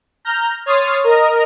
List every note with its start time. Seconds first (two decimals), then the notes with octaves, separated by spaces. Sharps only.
0.25 A#5 F6 G6
0.66 C#5 C6 D#6 F6 A6
1.04 A#4 D#5 A#5